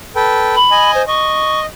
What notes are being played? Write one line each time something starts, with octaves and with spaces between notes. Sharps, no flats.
A4 B4 G5
B5
D#5 G#5
C5
D#5 C#6